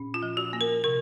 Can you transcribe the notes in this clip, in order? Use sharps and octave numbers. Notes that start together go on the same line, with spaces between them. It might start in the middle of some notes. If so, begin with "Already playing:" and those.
Already playing: A#2 C#4
F4
F3
F#4
A#3
A#4
C3 A#4